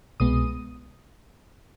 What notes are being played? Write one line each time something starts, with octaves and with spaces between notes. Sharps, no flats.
C2 B2 G#3 B3 D#6